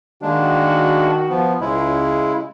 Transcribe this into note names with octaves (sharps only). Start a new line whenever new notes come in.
D#3 G#3 A#3 D4 F#4
F3 B3
C#2 C#3 G#3 E4